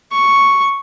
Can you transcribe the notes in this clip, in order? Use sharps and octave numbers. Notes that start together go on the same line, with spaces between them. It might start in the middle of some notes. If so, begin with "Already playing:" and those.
C#6